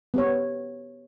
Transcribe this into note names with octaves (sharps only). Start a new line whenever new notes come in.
B3 G4 C#5